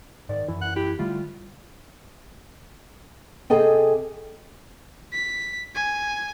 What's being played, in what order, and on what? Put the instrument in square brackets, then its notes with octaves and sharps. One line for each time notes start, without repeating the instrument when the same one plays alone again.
[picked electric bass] G#2 [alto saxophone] D#3 [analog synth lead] D5
[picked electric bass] F#2 E3 [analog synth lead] E4
[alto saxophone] F#5
[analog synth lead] E4 [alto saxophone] G4
[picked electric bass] D3 G3 [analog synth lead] A3 [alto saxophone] F4
[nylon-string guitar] C3 G#4 A4 D#5 G5
[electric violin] B6
G#5